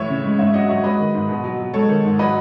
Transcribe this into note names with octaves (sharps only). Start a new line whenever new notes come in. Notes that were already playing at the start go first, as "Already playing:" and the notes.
Already playing: A2 E3 C#5 E5
C#3
G#3
G#2 C#5 E5
F#3 D#5 F#5
F#3 C#5 E5
G#3 B4 D#5
D#3
G#2
B2
F#3
F#3
G#3 A4 C#5
D#3
G#2
F#3 B4 D#5